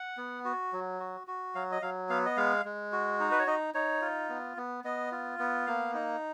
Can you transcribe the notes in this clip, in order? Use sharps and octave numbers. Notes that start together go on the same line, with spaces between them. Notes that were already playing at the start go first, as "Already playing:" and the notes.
Already playing: F#5
B3
F#4
F#3
F#4
F#4
F#3 F5
D#5
F#3 F5
B3 F5
D#5
G#3 F5
G#3
F#4
D#4
B4
C#5
D#4 D#5
D#4 C#5
F4
B3
B3
B3 D#5
F4
B3
A#3 F5
D#4